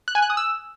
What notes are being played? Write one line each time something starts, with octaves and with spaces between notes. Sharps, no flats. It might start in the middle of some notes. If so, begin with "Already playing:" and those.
F#6
G#5
F#6
D#6
E6